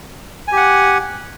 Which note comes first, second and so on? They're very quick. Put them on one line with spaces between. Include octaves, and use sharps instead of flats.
G#5 G4 F#5